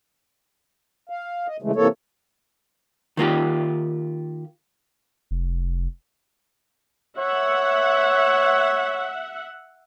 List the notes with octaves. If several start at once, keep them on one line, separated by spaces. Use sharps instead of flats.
F5
D#5
C#3 E3 G#3 A3
C3 E3 A#3 A4 C#5
D#3 A#3 F4 G4
F1
C#5 E5 F#5